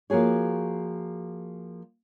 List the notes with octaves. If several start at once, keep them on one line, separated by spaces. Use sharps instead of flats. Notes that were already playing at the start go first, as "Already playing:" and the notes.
F3 A#3 F#4 G#4 C#5